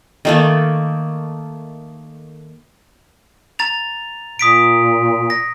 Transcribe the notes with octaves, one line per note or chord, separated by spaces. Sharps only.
D#3 A3 A#3
A#5 A6 F7
A#2 D#6 B6 D7
A#6